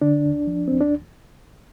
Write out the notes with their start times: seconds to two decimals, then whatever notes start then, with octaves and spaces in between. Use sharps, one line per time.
0.02 D3 D4
0.25 D#2
0.47 F3
0.68 D#2 C4
0.81 D4